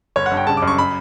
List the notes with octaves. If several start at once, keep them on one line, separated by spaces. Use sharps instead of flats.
G1 C#5
F#5
G2
G5
C#3 A5
D6
F#2
C#6
B5